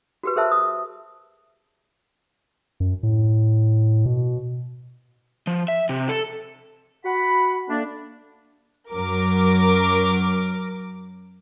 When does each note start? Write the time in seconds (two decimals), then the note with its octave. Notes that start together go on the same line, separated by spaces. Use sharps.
0.23 F#4 G4 B4
0.36 G#4 A#4 C5 E5 A5
0.51 D#6
2.80 F#2
3.03 A2
4.06 B2
5.47 F3
5.68 E5
5.89 C3
6.09 A4
7.04 F#4 F#5 B5
7.69 A3 A#3 D4
8.90 F#2 F#3 A#4 D6